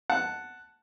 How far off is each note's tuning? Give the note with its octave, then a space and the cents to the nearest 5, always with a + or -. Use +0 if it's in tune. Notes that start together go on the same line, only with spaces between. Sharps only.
F#5 +0 A5 +0